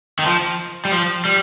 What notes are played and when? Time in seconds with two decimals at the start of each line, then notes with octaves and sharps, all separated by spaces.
0.19 D#3
0.26 F3
0.85 G3
0.92 F3
1.25 G3